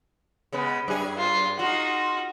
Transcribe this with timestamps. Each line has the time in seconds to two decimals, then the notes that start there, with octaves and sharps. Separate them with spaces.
0.52 C#3 G#3 B3
0.88 F#2 G#4
1.17 F4
1.59 D#4 F4 F#4